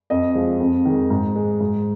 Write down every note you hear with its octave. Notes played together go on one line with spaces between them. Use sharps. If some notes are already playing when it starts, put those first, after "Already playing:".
F2 D#5
F3 G#3
F2
D#3 G#3
G#2
G#3
G#2